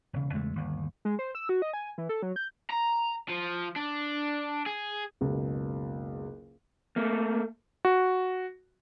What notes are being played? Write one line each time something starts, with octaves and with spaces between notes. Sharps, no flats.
E1 C#3
E2 C#3 G#3 A3
G1 D#2
G#3
C5
E6
F#4
D#5
G#5
E3
A4
F#3
G6
A#5
F3
D4
G#4
F#1 C#2 B2
A3 A#3
F#4